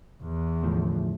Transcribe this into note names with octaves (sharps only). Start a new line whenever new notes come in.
E2
D2 A2 F3